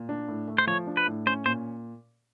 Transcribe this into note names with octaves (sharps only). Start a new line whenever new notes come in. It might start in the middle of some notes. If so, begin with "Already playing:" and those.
Already playing: A#2
D4
A2
A3
C5
F3 C#5
D4
B4
A2
C#4 C5
A#2 C5